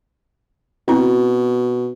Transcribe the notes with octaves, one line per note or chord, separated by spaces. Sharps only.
B2 C4 E4 F#4